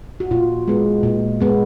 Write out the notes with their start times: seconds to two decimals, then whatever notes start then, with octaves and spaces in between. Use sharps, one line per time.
0.20 F#4
0.31 A#2 F4
0.68 G#3 B3
1.03 A#2
1.41 G#3 B3